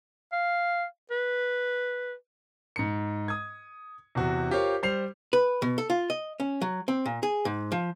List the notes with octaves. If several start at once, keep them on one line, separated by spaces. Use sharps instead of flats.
F5
B4
G#2 C#7
D#6 G#6
E2 C3 F#4
F4 G4 A#4 C5 C#5
G3 C5 C7 F7
B4
B2
A4
F4
D#5
C#4
F#3
C4
A#2
G#4
G#2
F3